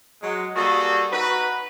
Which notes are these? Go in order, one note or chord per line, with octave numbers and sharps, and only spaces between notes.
F#3 G#3
G3 A#3 F#4 G#4 A4
D#4 F#4 B4